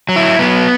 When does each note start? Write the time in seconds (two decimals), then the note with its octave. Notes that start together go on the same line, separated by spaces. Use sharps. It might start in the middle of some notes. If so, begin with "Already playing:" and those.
0.09 F#3
0.16 E4
0.39 F#3 B3